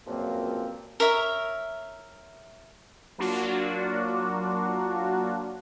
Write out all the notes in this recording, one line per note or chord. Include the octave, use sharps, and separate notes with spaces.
C#2 F#2 A#2 F3 A#3 C4
A#4 C#5 E5
F#3 A#3 D4 F4 F#4